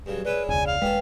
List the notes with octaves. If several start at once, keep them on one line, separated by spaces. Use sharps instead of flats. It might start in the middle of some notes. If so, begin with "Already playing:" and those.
G2 C#3 F#3
G#3 C#4 E4 B4 D5
E1 C#2 G#5
F5
D#1 G#3 A#3 C#4 A4 B4 G5